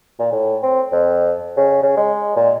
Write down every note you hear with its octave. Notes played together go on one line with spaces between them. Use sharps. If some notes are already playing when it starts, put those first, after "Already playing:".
A#2
A2
C4
F2
C#3
C#3
G#3
A#2